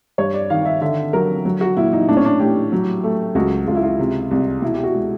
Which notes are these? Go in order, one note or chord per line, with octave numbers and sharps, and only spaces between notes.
G2 C#5
D5
D#3 F5
E5
D3 E5
F#3 A#4
F#3
F#4
A#2 E4
D#4
A2 D4
C#4
D4
A2 G4
F#3
A3
C#2 F#4
C#2 F4
E4
F4
C3
C2
B2 E4
G4
F#4
G#3